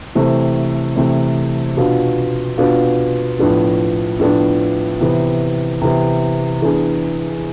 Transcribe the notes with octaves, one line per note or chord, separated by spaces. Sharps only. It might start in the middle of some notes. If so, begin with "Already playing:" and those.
C3 E3 A3 C4
C3 E3 A3 C4
B2 B3 D4 F4
B2 B3 D4 F4
A2 F3 B3 D4
A2 F3 B3 D4
C3 E3 B3
C3 E3 B3
E3 B3 D4 G#4